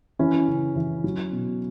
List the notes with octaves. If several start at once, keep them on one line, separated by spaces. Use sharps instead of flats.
E3 C#4 E4
C#3
E3
F#3
B2